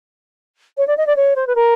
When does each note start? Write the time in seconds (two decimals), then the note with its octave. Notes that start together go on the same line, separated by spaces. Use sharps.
0.77 C#5
0.87 D5
0.97 D#5
1.07 D5
1.16 C#5
1.36 C5
1.47 B4
1.55 A#4